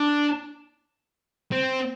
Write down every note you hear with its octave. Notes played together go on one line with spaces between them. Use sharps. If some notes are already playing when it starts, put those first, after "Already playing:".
Already playing: D4
C4